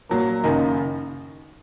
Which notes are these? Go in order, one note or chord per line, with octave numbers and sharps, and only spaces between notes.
A#2 F#3 A#3
F#1 F#2 D#3 A#3 D#4